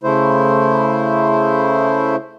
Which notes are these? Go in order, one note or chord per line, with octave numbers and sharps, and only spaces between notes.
C#3 A3 E4 C5